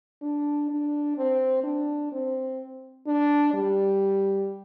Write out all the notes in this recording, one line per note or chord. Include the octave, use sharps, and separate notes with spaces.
D4
D4
C4
D4
C4
D4
G3